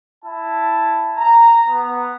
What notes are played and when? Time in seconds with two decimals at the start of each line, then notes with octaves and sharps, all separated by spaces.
0.24 E4 A5
1.18 A#5
1.69 B3